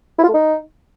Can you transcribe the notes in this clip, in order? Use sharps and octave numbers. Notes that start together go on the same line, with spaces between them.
E4
F4
A3
D#4